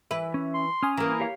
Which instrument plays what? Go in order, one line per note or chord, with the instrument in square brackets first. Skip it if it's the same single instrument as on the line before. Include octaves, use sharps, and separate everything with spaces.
[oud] E3 B4 [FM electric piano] E5
[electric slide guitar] C#4
[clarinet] C6
[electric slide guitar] C#4 [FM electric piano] G#5 D#6 F6
[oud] E3 A#3 [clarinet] A#5
[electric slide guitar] G4 C#5 F5